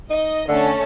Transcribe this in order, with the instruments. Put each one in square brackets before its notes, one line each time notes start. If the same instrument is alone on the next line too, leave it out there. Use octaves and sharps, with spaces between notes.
[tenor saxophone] D#4 [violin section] D#5
[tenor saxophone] D3 [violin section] A3 C#4 A5